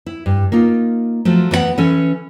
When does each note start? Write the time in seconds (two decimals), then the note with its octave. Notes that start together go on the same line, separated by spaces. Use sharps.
0.06 E4
0.26 G2
0.52 A#3 D#4 F4
1.25 F3 F#3 A3
1.51 E3 B3 C5 F#5
1.78 E3 C#4 A4